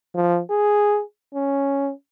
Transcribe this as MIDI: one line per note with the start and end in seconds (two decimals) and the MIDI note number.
0.15 0.40 53
0.51 1.02 68
1.34 1.91 61